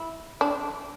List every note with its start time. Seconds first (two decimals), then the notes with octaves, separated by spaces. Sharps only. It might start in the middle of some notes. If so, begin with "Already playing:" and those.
Already playing: E4
0.41 D4